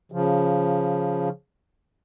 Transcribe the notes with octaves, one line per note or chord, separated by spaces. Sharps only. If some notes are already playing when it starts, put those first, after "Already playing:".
C#3 F3